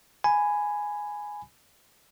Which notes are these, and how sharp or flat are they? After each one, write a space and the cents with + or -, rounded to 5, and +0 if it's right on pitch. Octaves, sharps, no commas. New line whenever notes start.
G#5 +0 B5 +10